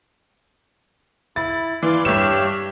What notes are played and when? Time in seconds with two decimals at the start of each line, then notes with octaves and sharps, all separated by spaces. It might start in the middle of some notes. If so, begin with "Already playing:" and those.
1.36 E4 A6
1.83 E3 D5 F5 C6
2.05 G2 G4 C#5 E5 E7